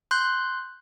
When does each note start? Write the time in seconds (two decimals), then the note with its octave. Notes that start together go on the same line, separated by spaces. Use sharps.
0.11 C6 F#6 G6